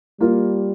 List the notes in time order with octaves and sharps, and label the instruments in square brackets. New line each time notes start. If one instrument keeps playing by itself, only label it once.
[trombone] G3 [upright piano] A#3 F4 A#4